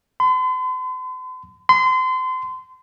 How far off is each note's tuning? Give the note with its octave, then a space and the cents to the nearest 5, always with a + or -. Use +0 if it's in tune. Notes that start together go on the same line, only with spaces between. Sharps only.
C6 -45
C6 -30